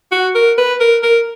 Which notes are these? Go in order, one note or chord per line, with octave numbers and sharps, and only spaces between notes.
F#4
A#4
B4
A#4
A#4